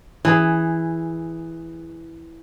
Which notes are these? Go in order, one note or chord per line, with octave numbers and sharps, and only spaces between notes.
E3 G#4